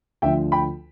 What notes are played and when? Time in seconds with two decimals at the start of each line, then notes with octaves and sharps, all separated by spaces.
0.22 D2 D3 F3 E5 G5
0.52 G5 B5